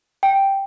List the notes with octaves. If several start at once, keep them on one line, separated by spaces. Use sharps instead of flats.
G5